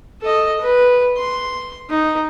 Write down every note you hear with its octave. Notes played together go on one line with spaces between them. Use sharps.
A4 D#5
B4
C6
D#4